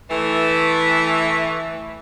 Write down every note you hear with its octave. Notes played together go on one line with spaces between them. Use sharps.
E3 A3